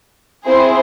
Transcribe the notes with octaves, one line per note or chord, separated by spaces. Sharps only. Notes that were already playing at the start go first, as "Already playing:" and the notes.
C4 E4 G#4 C5